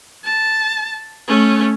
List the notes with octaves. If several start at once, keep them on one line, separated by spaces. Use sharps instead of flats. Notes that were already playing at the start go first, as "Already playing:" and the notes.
A5
A3 C#4